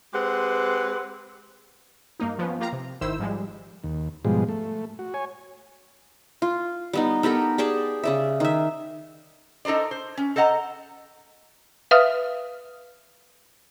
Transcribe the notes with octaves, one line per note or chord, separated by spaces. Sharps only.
G#3 C4 G4 B4 F#5
G2 A#3 D#4
F3 B3 C#4
A#3 F4 G4 F5 A#5
C3
G#1 D#3 E4 C5 E6
G#2 F3 G3 G#3
D#2
G#2 B2 F3 G3 G#3
A3
F#4
C#5 G#5
F4
G3 B3 D#4
B3 G4 A4 A#4
G4 G#4 D5 A5
C#3 D5 E5
D#3 E5
D#4 A4 A#4 C5 D5
C5
C#4
A4 C5 D#5 F#5 A#5
B4 E5 F5 D#6 F6